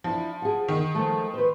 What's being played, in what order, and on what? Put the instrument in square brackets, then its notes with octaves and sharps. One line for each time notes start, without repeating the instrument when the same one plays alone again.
[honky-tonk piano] F3 [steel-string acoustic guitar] D4 E4
[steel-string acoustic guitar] G#4 F#5
[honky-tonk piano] D#3
[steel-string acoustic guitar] F3 G#3 A3
B4 C5